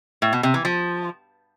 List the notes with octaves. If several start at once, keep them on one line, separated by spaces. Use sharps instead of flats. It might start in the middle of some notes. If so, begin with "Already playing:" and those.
A2
B2
C3
E3
F3